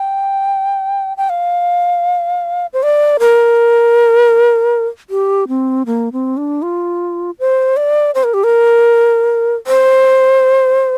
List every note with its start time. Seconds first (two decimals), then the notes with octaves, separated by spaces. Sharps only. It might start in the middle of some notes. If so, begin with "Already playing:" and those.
Already playing: G5
1.17 G5
1.30 F5
2.73 C5
2.83 D5
3.20 A#4
5.10 G4
5.49 C4
5.86 A#3
6.13 C4
6.37 D4
6.62 F4
7.39 C5
7.77 D5
8.15 C5
8.24 A#4
8.34 G4
8.44 A#4
9.67 C5